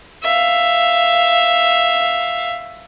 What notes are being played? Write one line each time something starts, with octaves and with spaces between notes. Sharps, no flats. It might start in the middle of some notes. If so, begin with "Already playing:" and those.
E5 F5